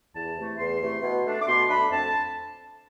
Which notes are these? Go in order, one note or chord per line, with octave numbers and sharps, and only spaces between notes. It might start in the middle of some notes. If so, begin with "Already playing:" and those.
E2 A5
C3 E3 A3
E2 C6
C3 E3 A3
B2
A3 D4
D6
B2 C6
A3 D4 B5
F2 A5